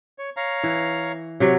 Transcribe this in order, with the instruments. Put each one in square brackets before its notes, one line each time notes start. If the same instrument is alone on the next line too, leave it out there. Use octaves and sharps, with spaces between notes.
[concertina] C#5
C#5 F5 A#5
[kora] E3
[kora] C3 F#3 [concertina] C#5